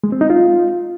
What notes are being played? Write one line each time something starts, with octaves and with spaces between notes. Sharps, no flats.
G#3
C4
D#4
F4